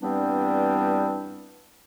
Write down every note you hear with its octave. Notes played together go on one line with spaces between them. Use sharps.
G2 E3 G3 B3 C4 D4